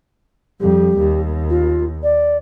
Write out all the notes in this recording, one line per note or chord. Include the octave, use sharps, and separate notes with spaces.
F2 G3 G4
D#2
F4
D5